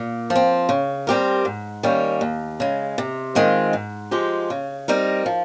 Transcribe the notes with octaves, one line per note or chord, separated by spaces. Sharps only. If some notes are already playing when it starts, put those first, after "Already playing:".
Already playing: A#2
F3
C4
C#3
G3 C4 G4 A#4
G#2
D#3 G3 A#3 C#4
D#2
C#3 G#3
C3
D#3 G#3 C4 F4
G#2
F3 G#3 D#4 G4
C#3
G3 C4 D#4 A#4
F3